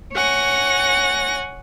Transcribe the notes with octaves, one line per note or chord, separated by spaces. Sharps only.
C#5 F#5 G#5 A#6